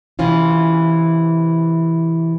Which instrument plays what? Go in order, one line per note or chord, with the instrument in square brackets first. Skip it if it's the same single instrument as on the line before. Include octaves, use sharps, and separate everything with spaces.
[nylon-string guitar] C3 E3 C#4 F4